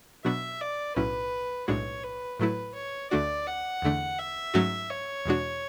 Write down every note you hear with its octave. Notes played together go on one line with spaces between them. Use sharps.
B2 F#3 B3 D4 F#4 E5
D5
B1 A2 F#3 C#4 E4 B4
B1 A2 G#3 D4 F#4 C#5
B4
A2 F#3 A3 E4 B4
C#5
D2 D3 A3 D4 F#4 D5
F#5
E2 D3 A3 D4
E5
G#2 F#3 A3 C#4 F#4
C#5
E2 B2 G#3 D4 F#4